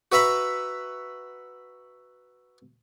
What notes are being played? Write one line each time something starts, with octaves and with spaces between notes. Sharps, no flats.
F#4 B4 E5 A#5 B5